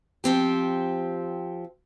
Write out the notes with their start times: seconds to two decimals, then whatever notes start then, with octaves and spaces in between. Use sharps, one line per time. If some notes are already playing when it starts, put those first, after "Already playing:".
0.24 F3 C4 G4